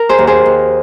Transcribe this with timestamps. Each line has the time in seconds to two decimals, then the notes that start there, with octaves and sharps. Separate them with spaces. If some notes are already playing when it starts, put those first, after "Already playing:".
Already playing: A#4
0.09 G#4 C5
0.18 D#2
0.27 G#4 C5
0.46 D#2